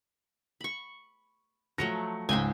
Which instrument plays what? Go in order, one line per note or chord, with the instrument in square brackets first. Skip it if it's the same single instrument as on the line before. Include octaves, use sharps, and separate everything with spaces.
[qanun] B5 C#6
[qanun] F3 F#3 A3 [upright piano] A#6 C#7
[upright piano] C#2 G#2 [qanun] C5 G5 G#5